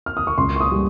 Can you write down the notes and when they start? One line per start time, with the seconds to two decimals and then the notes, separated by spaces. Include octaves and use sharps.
0.06 F6
0.17 D#6
0.27 C#6
0.38 C#2 C6
0.56 C#6
0.61 D#6
0.72 G3